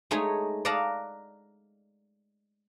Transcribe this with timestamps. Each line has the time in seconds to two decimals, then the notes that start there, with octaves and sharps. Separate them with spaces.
0.11 G#3 A3 D#4 G#4 C#5
0.65 D5 D#5 F5 F#5 A5 A#5